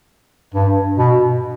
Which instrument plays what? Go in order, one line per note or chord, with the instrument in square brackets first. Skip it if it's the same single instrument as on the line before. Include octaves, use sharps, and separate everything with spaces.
[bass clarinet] G2
B2